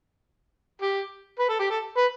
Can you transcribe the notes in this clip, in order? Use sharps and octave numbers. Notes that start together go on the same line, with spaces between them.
G4
B4
A4
G4
A4
B4